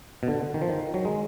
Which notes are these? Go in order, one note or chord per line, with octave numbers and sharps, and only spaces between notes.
B2
D3
D#3
F3
D#3
F#3
G#3